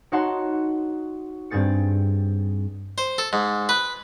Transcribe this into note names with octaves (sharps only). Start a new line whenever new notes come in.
D#4 F#4 C#5 F#5 A5 C6
G2 C4 G#4 A6 C#7
C5
A4
G#2
B4